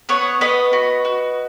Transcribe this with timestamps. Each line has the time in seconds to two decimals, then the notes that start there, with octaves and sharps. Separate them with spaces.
0.09 B3 C#5 F#5
0.41 B3 B4 D#5
0.73 F#4
1.05 F#4